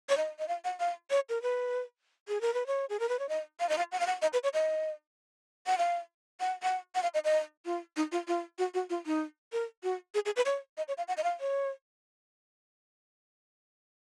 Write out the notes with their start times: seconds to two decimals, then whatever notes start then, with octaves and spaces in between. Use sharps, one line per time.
0.09 C#5
0.17 D#5
0.39 D#5
0.48 F5
0.64 F#5
0.80 F5
1.10 C#5
1.29 A#4
1.42 B4
2.28 G#4
2.41 A#4
2.54 B4
2.67 C#5
2.90 G#4
3.00 A#4
3.09 B4
3.19 C#5
3.29 D#5
3.60 F5
3.69 D#5
3.78 F5
3.92 F#5
4.00 F5
4.07 F#5
4.22 D#5
4.33 B4
4.44 C#5
4.54 D#5
5.67 F#5
5.78 F5
6.40 F#5
6.63 F#5
6.95 F#5
7.03 F5
7.14 D#5
7.25 D#5
7.65 F4
7.96 D#4
8.12 F4
8.28 F4
8.59 F#4
8.74 F#4
8.90 F4
9.06 D#4
9.53 A#4
9.83 F#4
10.14 G#4
10.26 G#4
10.36 B4
10.46 C#5
10.77 D#5
10.88 C#5
10.98 F5
11.08 F#5
11.17 D#5
11.24 F5
11.40 C#5